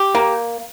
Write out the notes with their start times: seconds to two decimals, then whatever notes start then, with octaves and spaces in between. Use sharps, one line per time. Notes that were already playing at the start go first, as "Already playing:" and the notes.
Already playing: G4
0.15 A#3